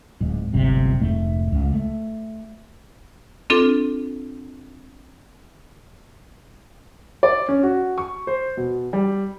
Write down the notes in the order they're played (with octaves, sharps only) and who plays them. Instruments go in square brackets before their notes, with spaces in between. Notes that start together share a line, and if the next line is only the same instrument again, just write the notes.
[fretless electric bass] D1 G#2
D1 G1 C3
F1 G#2 A3
C#2
A3
[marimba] C4 D4 F4 A4
[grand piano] D5
C#4
F#4
C#6
C5
B2
G3